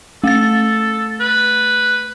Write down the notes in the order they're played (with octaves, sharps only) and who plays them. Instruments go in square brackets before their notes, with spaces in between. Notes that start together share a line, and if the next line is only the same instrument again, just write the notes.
[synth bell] A3 A6 [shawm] A4
[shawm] B4